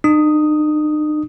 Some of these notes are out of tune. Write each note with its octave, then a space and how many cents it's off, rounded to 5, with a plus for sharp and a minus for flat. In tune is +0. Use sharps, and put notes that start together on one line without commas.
D#4 -45 D#6 +0